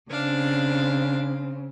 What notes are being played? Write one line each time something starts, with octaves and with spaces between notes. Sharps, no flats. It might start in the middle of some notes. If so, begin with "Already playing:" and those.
C#3 C4 D4 F5